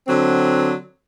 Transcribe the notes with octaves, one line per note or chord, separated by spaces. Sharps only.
D3 F#3 C4